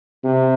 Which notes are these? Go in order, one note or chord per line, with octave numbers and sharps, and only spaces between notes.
C3